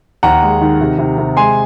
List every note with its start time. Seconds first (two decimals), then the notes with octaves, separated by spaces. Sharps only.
0.23 D#2 F#5 A#5
0.42 G#3
0.61 D#3
0.81 C3
0.99 C3
1.18 C3
1.37 G#3 G#5 C6